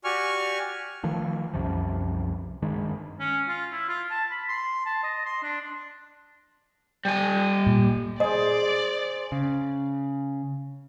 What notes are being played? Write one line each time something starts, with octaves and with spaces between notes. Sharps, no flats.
F#4 G4 D5 G#5 C#6 F6
D#3 F3 A3
C2 F#2 C3 F3
G2 D#3 G#3
C#4
F4
E4
F4
A5
B5
C6
A5
D#5
C6
D4
G3 G#5
A#2
G#4 C5 D5 D#5
C#3